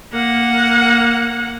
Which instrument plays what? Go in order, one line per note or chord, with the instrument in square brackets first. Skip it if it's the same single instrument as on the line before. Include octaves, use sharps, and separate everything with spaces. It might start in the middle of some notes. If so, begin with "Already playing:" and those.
[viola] A#3 F#5